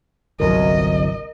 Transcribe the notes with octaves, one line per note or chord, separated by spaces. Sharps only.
G1 C2 F#3 A#4 D#5